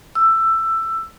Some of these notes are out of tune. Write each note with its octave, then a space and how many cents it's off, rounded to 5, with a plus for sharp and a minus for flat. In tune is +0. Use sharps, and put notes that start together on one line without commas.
E6 +15